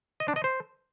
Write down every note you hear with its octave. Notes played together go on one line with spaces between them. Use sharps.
D#5
D4
D#5
C5